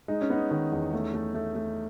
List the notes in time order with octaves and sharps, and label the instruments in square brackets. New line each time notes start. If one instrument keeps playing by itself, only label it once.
[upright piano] G#3 [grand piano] D#4
[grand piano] C#4
[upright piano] B3 [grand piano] D#4
[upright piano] D#3
E2
A3
A3
A3
A3